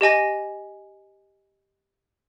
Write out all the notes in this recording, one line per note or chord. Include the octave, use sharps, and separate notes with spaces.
G4 D#5 G#5 A#6